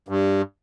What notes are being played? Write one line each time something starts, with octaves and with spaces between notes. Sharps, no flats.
G2